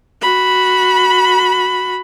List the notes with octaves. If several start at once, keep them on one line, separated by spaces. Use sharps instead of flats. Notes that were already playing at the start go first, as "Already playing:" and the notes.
F#4 B5